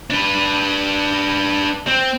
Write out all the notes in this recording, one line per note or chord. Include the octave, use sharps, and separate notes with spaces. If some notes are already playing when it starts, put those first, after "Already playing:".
D4 B4
C4